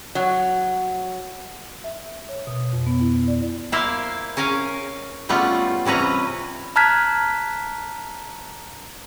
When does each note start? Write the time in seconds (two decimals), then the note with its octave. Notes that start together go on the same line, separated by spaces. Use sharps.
0.15 F#3
1.84 E5
2.29 C#5
2.47 B2
2.73 F2
2.86 B3
3.01 E4
3.28 D5
3.72 A#3 E4 C5 E5 F5
4.37 C#4 A#4 F5 G#5
5.29 G3 A3 B3 C#4 F4
5.85 C3 E3 C#4 B4 A#5
6.76 A5 A#5 F6 F#6 G#6 B6